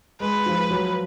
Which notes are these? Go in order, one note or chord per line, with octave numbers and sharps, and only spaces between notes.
G#3 B4
F3
F#3